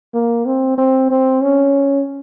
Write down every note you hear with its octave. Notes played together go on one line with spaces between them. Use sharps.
A#3
C4
C4
C4
C#4